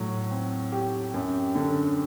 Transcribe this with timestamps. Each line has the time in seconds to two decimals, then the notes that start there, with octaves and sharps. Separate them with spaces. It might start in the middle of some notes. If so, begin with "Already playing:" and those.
Already playing: A2 F#3
0.31 C4
0.72 G4
1.14 F#2
1.55 D3